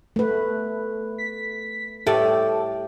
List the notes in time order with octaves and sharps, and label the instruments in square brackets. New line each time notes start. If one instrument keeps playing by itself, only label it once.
[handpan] A3 B4
[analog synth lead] B6
[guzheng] A2 A3 D5 [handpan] G4 [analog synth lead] A4